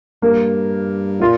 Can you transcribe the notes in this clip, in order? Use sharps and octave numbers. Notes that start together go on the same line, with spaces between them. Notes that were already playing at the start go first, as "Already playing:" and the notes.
G2 A#3
A#2 F4